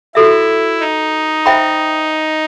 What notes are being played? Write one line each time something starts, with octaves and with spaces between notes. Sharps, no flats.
E4 F#4 A4 E5
D#4
C5 E5 G5 B5